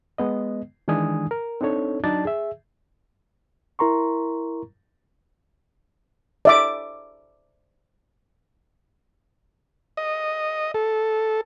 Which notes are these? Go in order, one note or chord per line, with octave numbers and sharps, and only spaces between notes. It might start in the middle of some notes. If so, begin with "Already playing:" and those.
G#3 B3 D#5
D#3 E3 G#3 D4 G#5 D#6
A#4
C4 D4 D#4 A4 C#5
F#3 D4 D#4 D5 A5 A6
G#4 E5
E4 A#4 A#5 C6 C#6
D5 E5 D6
D#5
A4